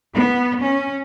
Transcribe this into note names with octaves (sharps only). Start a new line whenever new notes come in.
B3
C#4